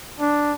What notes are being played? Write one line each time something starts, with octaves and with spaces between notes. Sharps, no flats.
D4